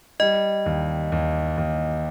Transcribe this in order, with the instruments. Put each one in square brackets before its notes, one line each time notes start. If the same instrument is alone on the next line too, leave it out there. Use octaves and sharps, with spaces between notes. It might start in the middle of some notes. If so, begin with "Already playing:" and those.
[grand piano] G3 [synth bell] D#5
[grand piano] D#2
D#2
D#2